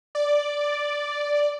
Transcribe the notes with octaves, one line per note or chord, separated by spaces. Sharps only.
D5